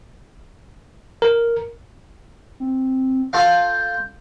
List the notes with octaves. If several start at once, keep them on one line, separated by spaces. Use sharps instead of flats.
A#4
C4
F4 A4 F5 G6